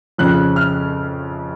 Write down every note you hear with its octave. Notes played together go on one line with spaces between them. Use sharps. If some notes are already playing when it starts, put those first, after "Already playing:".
F2 C#3 F3 F#6
F6